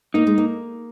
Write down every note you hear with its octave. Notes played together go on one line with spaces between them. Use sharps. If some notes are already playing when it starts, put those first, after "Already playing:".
A#3 D#4
G#3
A#3